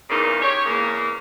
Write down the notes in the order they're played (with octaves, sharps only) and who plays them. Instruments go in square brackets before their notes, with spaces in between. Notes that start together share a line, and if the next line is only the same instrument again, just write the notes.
[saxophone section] E2 A#2 C#3 A#3 D#4
G4 C#5
E2 C#3 A#3